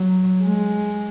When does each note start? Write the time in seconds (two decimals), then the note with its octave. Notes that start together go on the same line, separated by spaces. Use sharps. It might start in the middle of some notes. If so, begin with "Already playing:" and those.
Already playing: F#3
0.43 G#3